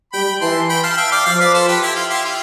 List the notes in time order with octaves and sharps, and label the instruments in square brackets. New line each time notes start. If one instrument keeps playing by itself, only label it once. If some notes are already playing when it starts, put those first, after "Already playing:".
[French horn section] G3 [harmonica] G5 B5
[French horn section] E3 [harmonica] A5 C6
[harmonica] G5 B5
F5 A5
E5 G5
D5 F5
[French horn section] F3 [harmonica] D5 F5
[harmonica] B4 D5
A4 C5
G4 B4
E4 G4
F4
E4 G4
F4